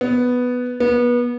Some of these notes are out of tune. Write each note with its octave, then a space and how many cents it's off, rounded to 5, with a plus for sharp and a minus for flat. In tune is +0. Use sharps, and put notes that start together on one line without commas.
B3 +5
B3 -25